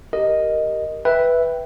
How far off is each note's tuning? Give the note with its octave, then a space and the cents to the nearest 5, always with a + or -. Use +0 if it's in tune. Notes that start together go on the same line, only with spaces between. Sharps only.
G4 +0 A#4 +0 D#5 +0
B4 +0 E5 +0 G5 -5